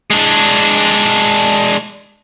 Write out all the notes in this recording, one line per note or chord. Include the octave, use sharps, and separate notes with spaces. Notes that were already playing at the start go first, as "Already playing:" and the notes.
G#3 D4